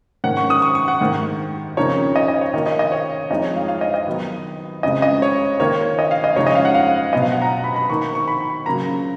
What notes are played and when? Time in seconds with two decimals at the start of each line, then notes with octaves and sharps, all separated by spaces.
0.24 G#2 D#3 A#3 C#4 F#5
0.37 C#6
0.50 D#6
0.62 C#6
0.75 C#6
0.88 F#5
1.01 G#2 D#3 A#3
1.77 F2 C#3 F3 A#3 D#4 C#5
2.16 D#5
2.28 D#5
2.41 C#5
2.54 D#3 A#3 F4 D#5
2.66 D#5
2.79 D#5
2.92 C#5
3.30 F2 F3 G#3 D#4 D#5
3.43 C#5
3.56 F5
3.68 F5
3.81 D#5
3.94 D#5
4.07 D#3 F#3 B3
4.83 F2 C#3 G#3 D#5
5.02 D#5
5.22 C#5
5.60 D#3 A#3 F4 C#5
5.99 D#5
6.11 F5
6.24 D#5
6.36 C#3 F3 G#3 D#4 C#5
6.47 D#5
6.55 F5
6.65 F#5
6.75 F5
7.13 B2 F#3 B3 F4 D#5
7.22 F5
7.32 F#5
7.42 A#5
7.64 B5
7.76 B5
7.89 D#3 A#3 D#4 C#6
8.02 C#6
8.15 C#6
8.28 B5
8.66 C#3 F#3 A#3 F4 A#5